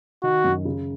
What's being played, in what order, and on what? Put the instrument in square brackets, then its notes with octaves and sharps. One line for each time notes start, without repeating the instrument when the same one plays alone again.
[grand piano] D#3 [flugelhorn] F#4
[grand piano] F#2
C#3